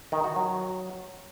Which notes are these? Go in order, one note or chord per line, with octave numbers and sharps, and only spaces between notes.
D#3
F#4
F#3